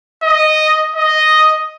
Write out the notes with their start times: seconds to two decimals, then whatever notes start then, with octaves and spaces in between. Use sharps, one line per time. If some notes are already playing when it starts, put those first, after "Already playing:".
0.23 D#5
0.96 D#5